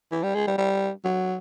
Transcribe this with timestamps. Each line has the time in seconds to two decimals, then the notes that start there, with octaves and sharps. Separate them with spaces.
0.12 E3
0.23 G3
0.35 G#3
0.47 G3
0.58 G3
1.05 F#3